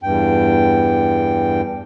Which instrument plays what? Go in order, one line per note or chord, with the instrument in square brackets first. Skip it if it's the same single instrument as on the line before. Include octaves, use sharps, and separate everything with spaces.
[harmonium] E2 G2 G5